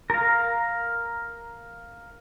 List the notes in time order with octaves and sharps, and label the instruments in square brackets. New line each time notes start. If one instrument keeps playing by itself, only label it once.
[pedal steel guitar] A#4 F5